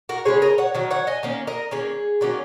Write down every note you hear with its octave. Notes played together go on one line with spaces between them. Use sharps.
F#4 A#4
C#3 G#3 C#4 G#4 C#5
A#4 D#5
C#5 F#5
D#3 F#3
C#5 F#5
D#5 G#5
D#3 A#3 C#4
A#4 D#5
D#3 A#3 C#4 G#4 C#5
D#3 F#3 A#3 C#4